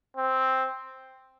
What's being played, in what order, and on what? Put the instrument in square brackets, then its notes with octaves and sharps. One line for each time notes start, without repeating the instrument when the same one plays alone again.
[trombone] C4